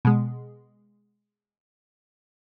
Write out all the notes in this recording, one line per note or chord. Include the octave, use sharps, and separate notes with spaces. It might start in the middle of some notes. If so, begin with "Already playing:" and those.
B2 G#3